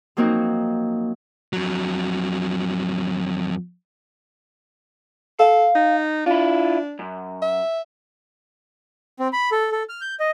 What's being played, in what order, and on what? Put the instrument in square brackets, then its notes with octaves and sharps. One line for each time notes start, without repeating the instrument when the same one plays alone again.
[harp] F3 F#3 A#3 C4 D#4 F#4
[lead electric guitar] F2 F#3
[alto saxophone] A4 [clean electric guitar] F5
[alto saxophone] D#4
[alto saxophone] D4 [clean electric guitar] E4 F4
[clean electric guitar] F#2
[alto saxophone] E5
[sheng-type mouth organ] C4
B5
A4
A4
F6
G6
D#5